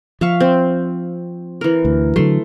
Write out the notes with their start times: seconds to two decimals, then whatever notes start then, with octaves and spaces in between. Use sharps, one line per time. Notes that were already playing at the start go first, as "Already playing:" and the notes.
0.21 F3 E5 F5 C#6
0.40 C4
1.61 E3 A#4
1.85 D2
2.16 D3 D#3 F#3 A3 C6